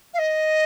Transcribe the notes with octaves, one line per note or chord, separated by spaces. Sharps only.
F5
D#5